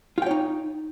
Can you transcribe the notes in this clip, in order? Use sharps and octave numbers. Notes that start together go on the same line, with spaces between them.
D#4 F4 C#5 G5